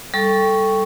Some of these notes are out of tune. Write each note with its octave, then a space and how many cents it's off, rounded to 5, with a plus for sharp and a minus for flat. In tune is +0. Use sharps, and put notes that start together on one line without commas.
G3 +0 A4 +0 C#6 +0